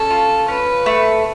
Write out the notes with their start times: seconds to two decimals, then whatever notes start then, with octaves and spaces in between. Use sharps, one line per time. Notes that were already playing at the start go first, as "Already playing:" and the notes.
Already playing: C#4 A4
0.11 F4
0.48 C#4 B4
0.86 A3